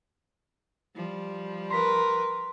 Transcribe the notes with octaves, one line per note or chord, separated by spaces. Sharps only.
F3 G3
A#4 B4 C6 B6